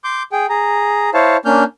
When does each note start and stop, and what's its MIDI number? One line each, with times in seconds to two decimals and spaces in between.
0.04 0.23 84
0.04 0.23 86
0.04 0.23 91
0.32 0.46 68
0.32 0.46 79
0.49 1.10 68
0.49 1.10 82
1.14 1.37 64
1.14 1.37 72
1.14 1.37 73
1.14 1.37 77
1.14 1.37 81
1.45 1.64 58
1.45 1.64 61
1.45 1.64 62
1.45 1.64 89
1.45 1.64 91